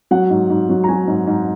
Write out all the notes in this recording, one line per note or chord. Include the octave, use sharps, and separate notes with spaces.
F#3 F#5
G#2
G#2
F#3
A#5
F#3 G#5
G#2
G#2